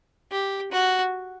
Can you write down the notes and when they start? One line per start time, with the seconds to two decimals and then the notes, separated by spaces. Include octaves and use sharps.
0.32 G4
0.72 F#4